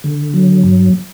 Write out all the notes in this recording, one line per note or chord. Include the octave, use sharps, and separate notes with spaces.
D3
F#3
G2